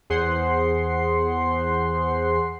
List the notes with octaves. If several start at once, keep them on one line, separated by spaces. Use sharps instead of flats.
E2 G#4 C5 F#5 C6 C7